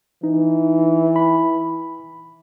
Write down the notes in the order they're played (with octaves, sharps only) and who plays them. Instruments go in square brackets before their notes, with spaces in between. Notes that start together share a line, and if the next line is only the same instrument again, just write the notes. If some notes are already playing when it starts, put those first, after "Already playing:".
[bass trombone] E3 [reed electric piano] D#4
[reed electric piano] B5